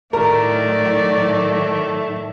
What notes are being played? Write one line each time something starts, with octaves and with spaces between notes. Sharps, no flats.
A2 D#3 F#3 A3 A#4 D5